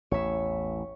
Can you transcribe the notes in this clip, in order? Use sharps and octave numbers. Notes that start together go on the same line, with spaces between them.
A1 E2 C#5 E5